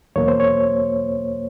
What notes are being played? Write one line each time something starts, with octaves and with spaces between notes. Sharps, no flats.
E2 B2 F#3 A#3 C#5
C5
C#5